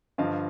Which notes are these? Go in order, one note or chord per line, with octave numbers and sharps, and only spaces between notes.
G2 D3 F3 D#5 F5